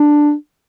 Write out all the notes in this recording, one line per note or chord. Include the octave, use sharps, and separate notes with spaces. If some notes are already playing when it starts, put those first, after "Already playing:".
Already playing: D4